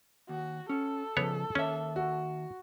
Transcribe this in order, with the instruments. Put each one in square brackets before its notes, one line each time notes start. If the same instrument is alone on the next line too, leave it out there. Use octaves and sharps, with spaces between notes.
[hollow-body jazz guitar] D#2 [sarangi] F#4
[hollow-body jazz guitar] C#4 [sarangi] A4
[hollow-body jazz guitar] C#3 F3 [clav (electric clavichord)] B3 C#5
[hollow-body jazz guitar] D#2 E5 [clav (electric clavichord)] C#4
[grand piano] F#4